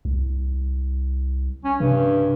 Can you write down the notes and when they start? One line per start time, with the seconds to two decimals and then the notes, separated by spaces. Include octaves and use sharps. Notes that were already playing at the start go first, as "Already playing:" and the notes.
0.05 C2
1.65 C#4
1.80 G2 C3